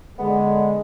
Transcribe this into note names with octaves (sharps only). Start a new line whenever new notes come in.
D3 G#3 B3